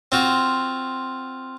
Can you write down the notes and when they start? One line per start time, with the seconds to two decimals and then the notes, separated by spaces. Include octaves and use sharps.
0.12 C4 F4 F#4